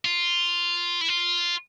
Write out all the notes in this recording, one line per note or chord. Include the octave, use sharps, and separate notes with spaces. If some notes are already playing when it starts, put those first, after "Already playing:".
F4
E4
F4